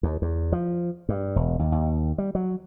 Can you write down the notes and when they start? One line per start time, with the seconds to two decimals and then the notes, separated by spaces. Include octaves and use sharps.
0.03 D#2
0.22 E2
0.52 F3
1.09 G2
1.36 E1
1.59 D#2
1.72 D#2
2.18 G3
2.35 F#3